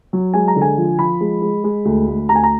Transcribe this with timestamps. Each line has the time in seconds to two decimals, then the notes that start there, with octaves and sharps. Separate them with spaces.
0.13 F#3
0.34 G#3 G#5
0.48 A#5
0.56 D3
0.62 G#5
0.77 F3
0.99 F3 B5
1.21 G#3
1.42 G#3
1.64 G#3
1.85 D2
2.08 D2
2.29 D2 A#5
2.35 G#5
2.43 A#5